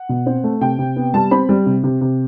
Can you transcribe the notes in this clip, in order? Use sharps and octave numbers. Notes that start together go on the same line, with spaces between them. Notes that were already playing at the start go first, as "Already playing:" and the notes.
Already playing: F#5
B2
C4
A3
C3 G5
C3
B3
G3 A5
C4 B5
G3
C3
C3
C3